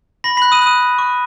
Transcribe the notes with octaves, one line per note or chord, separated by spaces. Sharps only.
B5 A#6
B5 F#6 B6
D#6 D#7
D#6 F#6 D#7
F#6
C#6